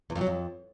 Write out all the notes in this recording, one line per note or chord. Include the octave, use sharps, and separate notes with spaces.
E2
F2
F#3
F2